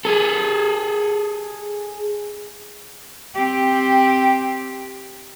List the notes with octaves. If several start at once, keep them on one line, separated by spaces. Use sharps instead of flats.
G#4 A4
C4 G4